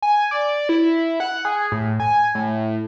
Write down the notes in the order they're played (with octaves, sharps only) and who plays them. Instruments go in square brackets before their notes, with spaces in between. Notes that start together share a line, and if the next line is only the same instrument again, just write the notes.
[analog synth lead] G#5
D5
E4
F#5
G#4
A2
G#5
A2